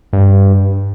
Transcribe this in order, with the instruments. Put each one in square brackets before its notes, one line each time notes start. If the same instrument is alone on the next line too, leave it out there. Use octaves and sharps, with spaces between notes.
[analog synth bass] G2